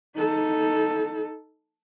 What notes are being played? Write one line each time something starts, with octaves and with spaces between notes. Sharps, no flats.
D#4 A4